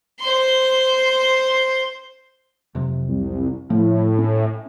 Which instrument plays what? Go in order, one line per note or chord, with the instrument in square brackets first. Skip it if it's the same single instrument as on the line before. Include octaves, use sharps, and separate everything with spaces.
[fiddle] C5 C6
[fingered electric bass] F2 C3 F#3
[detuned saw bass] C2
[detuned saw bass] A2 [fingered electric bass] F3
[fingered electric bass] C#4